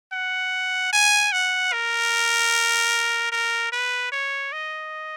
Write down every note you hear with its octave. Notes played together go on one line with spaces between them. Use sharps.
F#5
G#5
F#5
A#4
A#4
B4
C#5
D#5